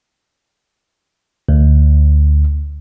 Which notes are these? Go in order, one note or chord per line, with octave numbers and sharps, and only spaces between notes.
D2